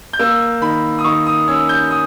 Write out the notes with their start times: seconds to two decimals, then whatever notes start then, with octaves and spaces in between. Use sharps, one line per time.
0.13 G6
0.19 A#3 E6
0.61 D#3 B5
0.99 D#6
1.04 D#3 C#6
1.27 D#6
1.48 C#4 E6
1.69 G6
1.91 D#6